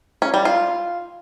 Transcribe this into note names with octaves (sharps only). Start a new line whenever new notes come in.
C#4
G3
F4